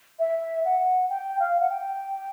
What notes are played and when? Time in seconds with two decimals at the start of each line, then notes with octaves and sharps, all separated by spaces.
0.19 E5
0.65 F#5
1.10 G5
1.40 F5
1.60 F#5
1.69 G5